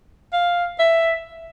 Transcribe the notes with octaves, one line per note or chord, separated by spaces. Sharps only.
F5
E5